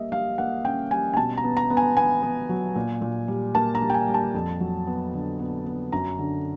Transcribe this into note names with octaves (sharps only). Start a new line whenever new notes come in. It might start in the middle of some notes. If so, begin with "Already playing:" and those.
Already playing: G3 A#3 D#5 E5
G3 F5
A#3 F#5
C#4 G5
G3 G#5
G#5
B2 A5
A#5
B3
A#5
B3
G#5
B3 G#5
B3
F#3
A#2
A#2
G3
A#3 A5
A#5
G3
G5
G#5
G3
A5
F2
F#3
B3
D3
B3
B3
F#2 A#5
D3